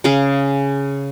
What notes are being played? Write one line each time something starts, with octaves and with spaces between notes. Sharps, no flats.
C#3 G#4 F5